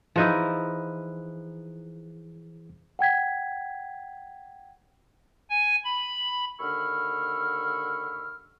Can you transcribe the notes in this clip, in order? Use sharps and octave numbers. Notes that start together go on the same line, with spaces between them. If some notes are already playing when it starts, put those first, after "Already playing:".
E3 F3 D#4 E4 G#4 F#6
F#5 G5 G#6 B6
G#5
B5
D#2 D3 B5 C#6 E6 F6